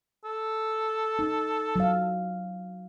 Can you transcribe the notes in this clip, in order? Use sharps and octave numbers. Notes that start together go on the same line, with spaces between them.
A4
D#4
F#3 F5